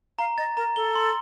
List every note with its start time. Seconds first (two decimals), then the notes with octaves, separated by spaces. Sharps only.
0.19 F5 A#5
0.38 D#5 A6
0.57 A#4 A#5
0.76 A4 G7
0.95 C6